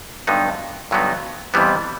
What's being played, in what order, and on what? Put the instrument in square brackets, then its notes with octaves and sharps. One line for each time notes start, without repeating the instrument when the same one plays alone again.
[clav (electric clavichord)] G2 D3 F#3 B3 D#4
G2 D3 F#3 B3 D#4
F2 C3 E3 G3 B3